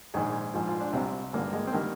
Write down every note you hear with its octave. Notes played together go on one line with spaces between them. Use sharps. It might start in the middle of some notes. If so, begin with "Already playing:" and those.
A#1 G#2 D#3 G#4
A#1 G#2 F3
F4
D4
C2 C3 G3 C4
G#1 G2 D3 G3 A#3
G#3
C4
D#3 G3 A#3